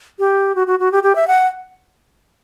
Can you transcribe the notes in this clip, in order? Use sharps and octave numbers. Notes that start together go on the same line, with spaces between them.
G4
F#4
F#4
F#4
G4
G4
E5
F#5